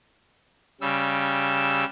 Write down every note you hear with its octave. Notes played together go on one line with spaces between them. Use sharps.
C#3 G3 E6